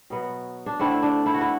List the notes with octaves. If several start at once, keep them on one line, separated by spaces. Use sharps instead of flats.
B2 F#3 B3
D4
D3 A3 C4 E4
D4
E4
F#4
E4